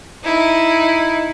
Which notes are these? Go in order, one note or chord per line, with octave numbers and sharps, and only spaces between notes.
D#4 E4